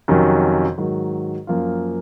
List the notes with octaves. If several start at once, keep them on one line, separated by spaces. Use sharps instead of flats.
F2 C3 D#3 F#3 C#4
G#2 D#3 F#3
F#2 F3 A#3 F4